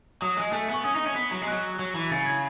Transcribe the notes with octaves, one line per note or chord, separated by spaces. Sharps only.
F#3 D#6
G#3
A3 G#5
B3
C#6
C#4 D#6
D#4
C#4
B3
F#3
G#3
F#3 F#6
F#3
E3
C#3 A6
G#6